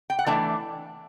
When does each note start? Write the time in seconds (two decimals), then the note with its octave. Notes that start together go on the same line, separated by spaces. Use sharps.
0.10 G5
0.19 F#5
0.27 E3 A3 D4 E5